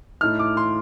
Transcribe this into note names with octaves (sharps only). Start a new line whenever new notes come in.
A2 A3 D#4 F6
D6
C6